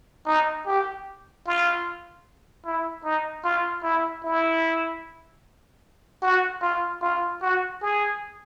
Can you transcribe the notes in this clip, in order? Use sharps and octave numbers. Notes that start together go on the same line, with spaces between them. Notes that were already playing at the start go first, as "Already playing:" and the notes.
D#4
G4
F4
E4
D#4
F4
E4
E4
F#4
F4
F4
F#4
G#4